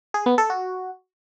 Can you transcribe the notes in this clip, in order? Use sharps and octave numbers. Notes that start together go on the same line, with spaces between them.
G#4
B3
A4
F#4